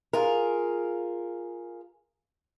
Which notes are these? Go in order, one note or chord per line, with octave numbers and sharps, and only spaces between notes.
F4 G#4 A#4